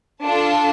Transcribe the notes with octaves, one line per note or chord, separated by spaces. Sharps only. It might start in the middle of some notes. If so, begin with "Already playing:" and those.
D4 F4 A4 A5